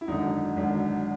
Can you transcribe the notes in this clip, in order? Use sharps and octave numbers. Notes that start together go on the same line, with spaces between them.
E4
G#1 F#2 D3 D#4
G#1 F#2 D3